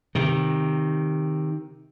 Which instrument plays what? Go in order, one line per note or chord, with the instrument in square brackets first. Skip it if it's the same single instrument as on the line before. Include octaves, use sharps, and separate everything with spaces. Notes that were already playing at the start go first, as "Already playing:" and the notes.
[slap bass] C3 D#3